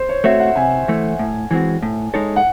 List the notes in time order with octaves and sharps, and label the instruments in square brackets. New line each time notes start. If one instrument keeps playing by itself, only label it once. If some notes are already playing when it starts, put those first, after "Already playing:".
Already playing: [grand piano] C5
C#5
[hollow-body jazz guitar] A3 C4 F#4 C#5 [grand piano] E5
[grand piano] F#5
[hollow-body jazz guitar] C3 [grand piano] G#5
[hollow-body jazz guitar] E3 A3
A2
E3 G#3 C4 F#4
A2
G#3 D#4 A4 C#5
[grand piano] F#5